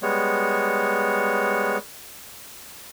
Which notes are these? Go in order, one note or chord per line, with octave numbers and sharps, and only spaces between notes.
G3 G#3 B3 C#5